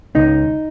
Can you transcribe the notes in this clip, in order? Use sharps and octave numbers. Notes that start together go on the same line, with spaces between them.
C#2 D#4